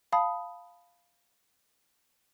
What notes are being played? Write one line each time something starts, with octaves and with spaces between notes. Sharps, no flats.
F5 A5 B5 D#6